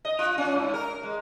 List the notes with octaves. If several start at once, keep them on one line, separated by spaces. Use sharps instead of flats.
D#5
F4
C#4
G#2
A#4
G#3